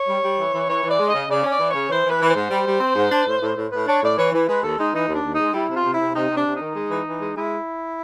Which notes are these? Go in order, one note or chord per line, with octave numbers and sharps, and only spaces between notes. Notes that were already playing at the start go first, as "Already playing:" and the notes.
Already playing: C#5
G3
G3
E3
E3
E3 C#5
E3
D5
G#3
D#5
C#3
C#3 D5
C#4
D5
E3
C#3 C#5
E3 C5
E3
B4
E3
G#2 C5
G3
G3
C4
G#2
D4
A2
A2
A2
A2 B4
D4 C#5
A2 D5
E3 C#5
E3
G#3 B4
D#2 A4
G#3 D#4
E3 D#4
D#2
D4
D#2
D#4
G#3
G3 E4
C3 F4
C3
C3 E4
C3 D#4
C3
D4
C3
D#4
D#3
G#3
E3
E3
G#3
G#3 E4